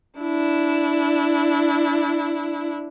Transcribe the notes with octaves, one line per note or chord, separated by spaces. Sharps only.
D4 E4